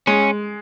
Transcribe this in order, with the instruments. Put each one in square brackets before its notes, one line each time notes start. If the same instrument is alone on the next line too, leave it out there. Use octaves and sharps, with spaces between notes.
[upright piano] G#3 [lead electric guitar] C#4